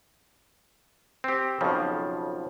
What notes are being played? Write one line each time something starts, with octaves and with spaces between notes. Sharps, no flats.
C4 G4
B1 F2 C#3 F3